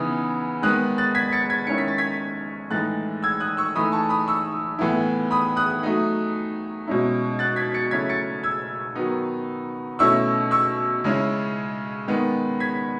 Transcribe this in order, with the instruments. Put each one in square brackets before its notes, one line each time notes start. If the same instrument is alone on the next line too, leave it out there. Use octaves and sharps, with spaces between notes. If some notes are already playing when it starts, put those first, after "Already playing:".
Already playing: [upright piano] C#3 E3 B3 D#4 D#6
D#3 G#3 B3 D#6 F#6
F#6 A6
G#6 B6
A6 C#7
G#6 B6
D#3 G#3 C#4 E4 C#7
B6
A6
G#6 B6
A2 E3 G#3 D#4 F#6 A6
E6 G#6
D#6 F#6
C#6 E6
E3 A3 D#4 B5 D#6
A5 C#6
B5 D#6
C#6 E6
A2 E3 B3 E4
B5 D#6
D#6 F#6
F#3 A3 D#4
B2 G#3 C#4 E4
F#6 A6
G#6 B6
A6 C#7
C#3 F#3 A3 C#4 E4 G#6 B6
A6 C#7
E6 G#6
D#3 F#3 B3 D#4
B2 A3 C#4 E4 C#6 E6
C#6 E6
C#3 G#3 C#4 E4
D#3 G#3 B3 D#4
G#6 B6